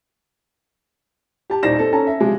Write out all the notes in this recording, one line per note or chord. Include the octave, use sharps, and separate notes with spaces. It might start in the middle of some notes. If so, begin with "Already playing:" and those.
G4 A5
D#1 D#4 C5 D5 A#6 E7
C4 A4
C#4 A4 A5 A#5
E5
C3 F3 F#3 G#3